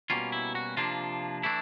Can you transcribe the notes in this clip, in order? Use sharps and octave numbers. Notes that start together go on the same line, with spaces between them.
B2 G3 A#3 C#4 F4
E4
F#4
C3 F3 A#3 D4 F4
E3 A3 D4 E4